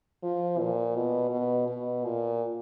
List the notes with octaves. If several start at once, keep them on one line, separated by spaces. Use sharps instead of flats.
F3
A#2
B2
B2
B2
A#2